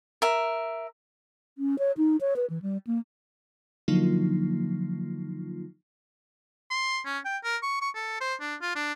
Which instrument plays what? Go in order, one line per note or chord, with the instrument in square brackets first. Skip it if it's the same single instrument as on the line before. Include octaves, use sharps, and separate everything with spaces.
[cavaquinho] A#4 E5
[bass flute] C#4
C#5
D#4
C#5
B4
E3
G3
A#3
[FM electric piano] D3 F3 F#3 A#3 D#4 F4
[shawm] C6
C#4
G5
A#4
C#6
C#6
A4
C5
D4
F4
D4